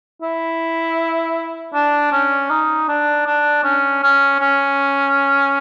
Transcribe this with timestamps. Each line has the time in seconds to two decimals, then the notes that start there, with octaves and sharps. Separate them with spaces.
0.22 E4
1.74 D4
2.12 C#4
2.50 D#4
2.88 D4
3.27 D4
3.64 C#4
4.03 C#4
4.40 C#4